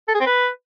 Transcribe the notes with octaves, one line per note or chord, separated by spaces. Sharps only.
A4
G#4
C4
B4